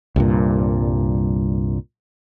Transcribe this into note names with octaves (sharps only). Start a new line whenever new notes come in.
C2 G2 A#2